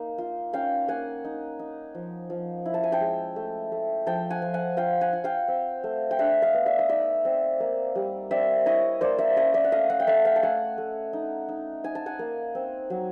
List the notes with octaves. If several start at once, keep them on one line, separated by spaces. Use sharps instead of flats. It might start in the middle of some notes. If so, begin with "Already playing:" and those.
Already playing: A#3 D#4
F4
C#4 F5 G5
A#3 F#5 G#5
D#4
D#4
F3
F3
E4
A5
G#5
G5 A5
G#3
A3
A3
F3 G5 A5
F#5 G#5
F3
F#5 G#5
F4 F5 G5
F#5 G#5
F4
F5 G5
C4
A3
G5
D4 E5 F#5
D#5 F5
B3
D5 E5
D#5
D#4 D5 E5
C4
A#3
G3
C4 D5 E5
E4 C#5 D#5
A#3 C5 D5
D5 E5
C#4 C#5 D#5
D5 E5
F#5
A3 D#5 F5
E5 F#5
G5
A3 E5 F#5
F5 G5
A5
A3 F#5 G#5
A3
D#4
D#4
D#4 G#5
A5
F#5 G#5
A#3
C4
F#3